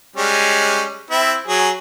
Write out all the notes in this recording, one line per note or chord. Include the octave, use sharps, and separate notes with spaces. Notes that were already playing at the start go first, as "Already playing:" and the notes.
G3 G#3 C#4
C4 E4
F#3 G#4